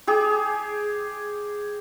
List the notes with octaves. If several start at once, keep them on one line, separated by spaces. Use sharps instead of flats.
G4 G#4